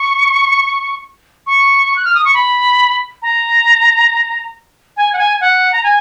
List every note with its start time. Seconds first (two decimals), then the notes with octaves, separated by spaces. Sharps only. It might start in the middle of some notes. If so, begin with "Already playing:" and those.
Already playing: C#6
1.47 C#6
1.96 F#6
2.05 F6
2.15 D#6
2.25 C#6
2.34 B5
3.22 A#5
4.97 G#5
5.13 F#5
5.18 G#5
5.41 F#5
5.72 A#5
5.84 G#5